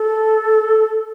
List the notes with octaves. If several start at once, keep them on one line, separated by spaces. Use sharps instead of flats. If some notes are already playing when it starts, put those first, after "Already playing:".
Already playing: A4